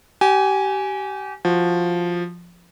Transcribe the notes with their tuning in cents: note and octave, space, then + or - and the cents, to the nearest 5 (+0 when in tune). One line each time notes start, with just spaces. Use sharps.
G4 -30 G#5 +0
F3 +0 F#4 -5